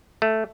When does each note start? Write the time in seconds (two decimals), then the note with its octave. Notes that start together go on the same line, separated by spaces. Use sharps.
0.22 A3